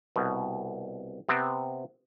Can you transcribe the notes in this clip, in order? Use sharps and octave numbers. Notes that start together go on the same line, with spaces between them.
C2 B2
C3 B3 C4